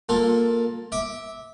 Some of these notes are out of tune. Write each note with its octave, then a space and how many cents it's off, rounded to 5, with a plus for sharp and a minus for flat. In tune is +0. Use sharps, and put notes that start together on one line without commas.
A#3 +0 F4 +25 A4 +0
E5 -20 D6 +0